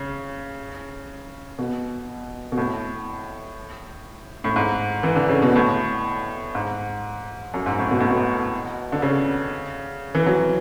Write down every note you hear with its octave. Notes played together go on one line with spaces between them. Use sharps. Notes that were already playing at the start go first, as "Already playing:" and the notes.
Already playing: C#3
B2
B2
A2
A2
G#2
E3
D3
C#3
B2
A2
G#2
F#2
G#2
A2
B2
A2
B2
D3
C#3
E3
F#3